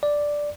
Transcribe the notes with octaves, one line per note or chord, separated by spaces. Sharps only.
D5